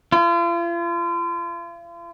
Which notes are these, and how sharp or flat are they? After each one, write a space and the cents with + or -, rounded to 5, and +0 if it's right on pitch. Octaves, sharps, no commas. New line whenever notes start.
F4 -40